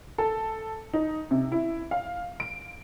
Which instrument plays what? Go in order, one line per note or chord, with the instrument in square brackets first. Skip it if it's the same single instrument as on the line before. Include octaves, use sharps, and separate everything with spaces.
[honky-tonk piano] A4
D#4
C3
E4
F5
D7